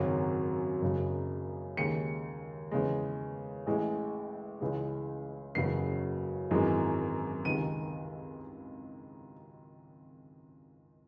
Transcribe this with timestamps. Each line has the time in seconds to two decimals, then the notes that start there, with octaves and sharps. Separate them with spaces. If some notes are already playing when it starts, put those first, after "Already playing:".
Already playing: G#1 F#2 C#3 F#3
0.82 F#1 F#2 C#3
1.77 D#2 C#3 G#3 C#7
2.71 E2 C#3 G#3
3.66 A1 A2 G#3
4.60 C#2 C#3 E3 G#3
5.55 F#1 E2 C#3 F#3 C7
6.51 G#1 F#2 E3 G#3
7.45 C#2 C3 D#3 G#3 D#7